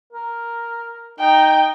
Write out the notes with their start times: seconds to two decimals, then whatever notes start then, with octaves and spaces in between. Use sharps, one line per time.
0.13 A#4
1.20 D#4 G5